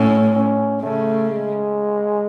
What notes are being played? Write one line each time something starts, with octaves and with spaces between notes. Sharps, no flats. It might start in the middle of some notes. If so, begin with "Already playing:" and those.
Already playing: A2 C#4
C#4
C#3 A3
G#3